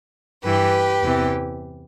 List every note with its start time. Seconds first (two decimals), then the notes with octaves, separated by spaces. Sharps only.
0.43 G2 E3 G4 B4
1.01 E2 C3 E3